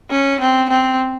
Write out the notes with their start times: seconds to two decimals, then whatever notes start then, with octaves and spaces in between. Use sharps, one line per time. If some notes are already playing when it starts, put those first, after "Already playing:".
0.10 C#4
0.40 C4
0.70 C4